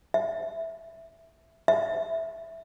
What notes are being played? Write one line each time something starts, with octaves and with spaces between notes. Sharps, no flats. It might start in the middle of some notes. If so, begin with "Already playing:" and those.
E5
E5